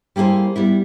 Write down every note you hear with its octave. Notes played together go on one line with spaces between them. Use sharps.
G3 A#3 E4 G#4 C5
G3 B3 E4